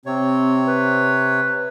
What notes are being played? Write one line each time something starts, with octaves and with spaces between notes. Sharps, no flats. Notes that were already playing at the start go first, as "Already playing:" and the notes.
C3 C4 C#5
B4